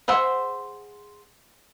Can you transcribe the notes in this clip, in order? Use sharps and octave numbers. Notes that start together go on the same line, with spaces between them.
G#4 C5 E5 F#5